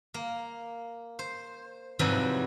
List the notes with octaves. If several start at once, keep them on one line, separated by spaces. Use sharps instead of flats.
A#3
C5
F2 G#2 C3 E3 F#3 G3